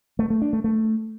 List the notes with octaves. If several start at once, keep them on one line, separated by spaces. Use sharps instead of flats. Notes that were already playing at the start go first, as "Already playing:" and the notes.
A3
A3
D4
A3
A3